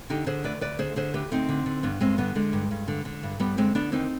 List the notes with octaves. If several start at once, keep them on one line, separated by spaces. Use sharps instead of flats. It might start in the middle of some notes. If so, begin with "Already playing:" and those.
D3 D#4 G4
D3 G#4 C5
D2 B4 D5
D2 B4 D5
D3 G#4 C5
D3 G#4 C5
D2 G4 B4
D2 C4 D#4
D3
D3
G2 B3 D4
G2 G#3 C4
D3 G3 B3
D3 G#3
G2
G2
D3
D3
G2
G2 G3 B3
D3 G#3 C4
D3 B3 D4
D#2 C4 D#4